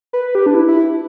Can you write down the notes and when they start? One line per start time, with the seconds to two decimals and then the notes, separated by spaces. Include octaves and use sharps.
0.13 B4
0.35 G4
0.46 D4
0.54 E4
0.68 E4